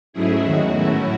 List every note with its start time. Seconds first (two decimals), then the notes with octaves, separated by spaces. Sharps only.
0.13 G#2 F#3 A3 C#4 E4 G#4
0.42 E2 D#3 G#3 F#4
0.72 A2 F#3 A3 C#4 E4